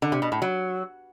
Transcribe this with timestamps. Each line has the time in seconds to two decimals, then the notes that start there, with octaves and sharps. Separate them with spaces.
0.02 D3
0.12 C3
0.22 B2
0.32 A2
0.42 F#3